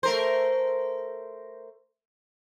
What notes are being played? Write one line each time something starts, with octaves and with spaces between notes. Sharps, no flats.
A3 A#4 C5